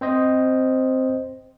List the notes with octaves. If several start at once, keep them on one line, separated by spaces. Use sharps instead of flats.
C4 C5 D#5